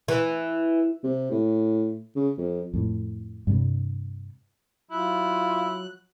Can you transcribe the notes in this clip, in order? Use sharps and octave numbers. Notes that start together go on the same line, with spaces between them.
E3
C3
A2
C#3
F2
F2 A2
G2 C3 G3
F#3 E4 F4 F#6